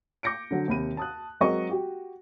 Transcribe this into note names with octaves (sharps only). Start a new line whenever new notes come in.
D6 G6 A#6 C#7 D7
D3 F#3
D#2 C3 B5 D#7
A5 D#6 F#6
F#3 G#3 C4 A#4 D#5 C#6
F#4 G4